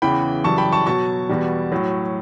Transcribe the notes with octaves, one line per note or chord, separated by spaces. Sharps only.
E2 C#3 E3 G5 B5
F#2 C#3 E3 G3 A5 C#6
G5 B5
A5 C#6
B2 F#3 A5 C#6
E2 B2 G3
A2 F#3